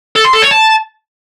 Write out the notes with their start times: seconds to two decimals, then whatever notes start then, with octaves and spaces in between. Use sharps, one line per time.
0.16 A4
0.25 C6
0.34 A4
0.43 C#5
0.51 A5